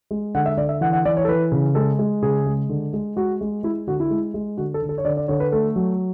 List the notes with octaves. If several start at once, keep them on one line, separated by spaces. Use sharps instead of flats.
G#3
D3 F#5
E5
D3 D5
E5
E3 F#5
F#5
E3 D5
C#5
A4
E3 B4
C#3
G#3 A4
G#3
C#3 G#4
G#3
D3
G#3
G#3 F#4
G#3
G#3 E4
D3 F#4
E4
G#3
G#3
D3 F#4
A4
D3
A4
C#5
D3 D5
D5
D3 C#5
B4
A3 A4
F#3